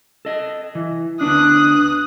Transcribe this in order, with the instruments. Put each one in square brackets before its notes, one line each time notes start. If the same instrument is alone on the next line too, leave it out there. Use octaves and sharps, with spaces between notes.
[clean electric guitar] A4 D#5
E3
[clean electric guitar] D2 B3 D4 [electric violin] D#6 F#6